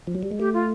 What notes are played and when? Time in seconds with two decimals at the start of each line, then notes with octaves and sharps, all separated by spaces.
0.07 F3
0.15 F#3
0.23 G3
0.31 G#3
0.39 A3 G4
0.54 F4